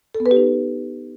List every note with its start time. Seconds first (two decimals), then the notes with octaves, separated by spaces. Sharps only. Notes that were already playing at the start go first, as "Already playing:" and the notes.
0.15 A4
0.20 B3
0.26 B4
0.31 G4
0.37 D#4